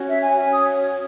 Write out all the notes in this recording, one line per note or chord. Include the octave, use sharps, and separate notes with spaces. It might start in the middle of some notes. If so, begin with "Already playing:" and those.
Already playing: C#4 F#4 C#5
E5
G#5
C#4 F#4 C#5 G#5
D#6